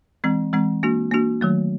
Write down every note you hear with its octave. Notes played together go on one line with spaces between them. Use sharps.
E3 G#3 C4
E3 G#3 C4
A#3 D4 F#4
A#3 D4 F#4
D#3 F#3 A3